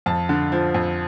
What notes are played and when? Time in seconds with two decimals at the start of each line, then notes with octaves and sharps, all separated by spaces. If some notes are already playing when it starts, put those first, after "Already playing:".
0.06 F2 A5
0.29 D3
0.52 F3
0.74 F2